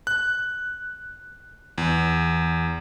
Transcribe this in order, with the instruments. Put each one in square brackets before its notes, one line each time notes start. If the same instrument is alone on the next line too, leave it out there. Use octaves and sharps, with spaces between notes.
[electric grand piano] F#6
E2